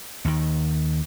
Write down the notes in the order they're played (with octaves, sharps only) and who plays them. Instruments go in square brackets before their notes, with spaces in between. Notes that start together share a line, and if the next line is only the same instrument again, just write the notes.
[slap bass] D#2 D#3